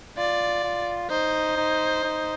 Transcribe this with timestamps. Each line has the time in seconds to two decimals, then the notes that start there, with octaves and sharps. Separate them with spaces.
0.17 F4 D5
0.64 F4
1.10 D#4 C5
1.57 D#4
2.04 D#4